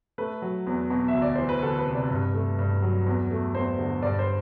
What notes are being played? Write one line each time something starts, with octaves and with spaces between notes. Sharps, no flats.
A3 B4
F#3
E2
B2
E5
D2
D5
E3 C5
B4
D2 A4
B4
C3
D5
G2
A3
G2
F#3
E2
A3
E2 C5
D3
G2 D5
C5